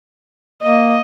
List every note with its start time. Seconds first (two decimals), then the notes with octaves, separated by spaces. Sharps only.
0.63 A#3 D#5